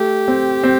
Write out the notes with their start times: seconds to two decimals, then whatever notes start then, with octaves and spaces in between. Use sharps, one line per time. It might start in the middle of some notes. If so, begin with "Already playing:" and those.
Already playing: A3 G4
0.28 C4
0.63 C4